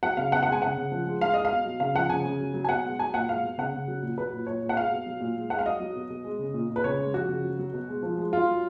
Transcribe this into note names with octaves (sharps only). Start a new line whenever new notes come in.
F#3 F#5
C#3 F5
B2 F#5
G#3 F#5
G#5
C#3 F#5
C#3
F3
G#3
G#3 F5
G#3 D#5
F5
B2
F#3
C#3 F5
F3 F#5
C#3 G#5
C#3
F#3
F#3
G#5
B2 F#5
G#3
F#3 G#5
A#2 F#5
G#3 F5
B2
C#3 F#5
C#3
F#3
A#2
F#3 B4
A#2
A#2 C#5
A#2
F#5
G#3 F5
B2
F#3
A#2
G#3
G#3 F#5
F5
F#3 D#5
F#3
B2
B2
G#3
C#3
A#2
A#2
B4
C#3 C#5
G#3
F3 F#4
C#3
F#3
F#3
B2
G#3
F3
G#3
F#3 F4
F#3